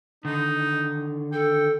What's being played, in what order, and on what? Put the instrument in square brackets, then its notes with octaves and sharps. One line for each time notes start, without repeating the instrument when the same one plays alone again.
[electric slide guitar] D3 D#3 [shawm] D#4
[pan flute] A4 [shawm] G5